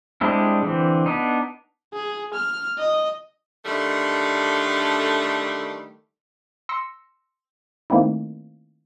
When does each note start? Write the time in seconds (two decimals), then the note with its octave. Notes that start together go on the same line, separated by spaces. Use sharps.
0.21 G3 G#3 C4 D4 E4
0.63 D3 E3 C4
1.06 B3 D4 D#4
1.94 G#4
2.34 F6
2.79 D#5
3.65 D3 D#3 G3 A3
6.69 C6 E6 A#6 C#7
7.90 D#3 A3 A#3 C4 D#4 E4